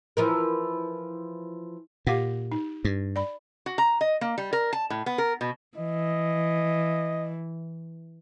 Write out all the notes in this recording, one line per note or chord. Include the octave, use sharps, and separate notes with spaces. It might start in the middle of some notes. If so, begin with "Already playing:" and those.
E3 F3 A#4
A#2 G4 F5 F#5
D#4
G2
D5 B5
F#4
A#5
D#5
A#3
G3
A#4
A5
A2
B3
A#4
B2
E3 D#5